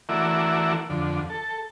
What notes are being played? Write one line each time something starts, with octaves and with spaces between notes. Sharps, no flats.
E3 A3 E4 F#4 A#4 D5
F2 D3
A4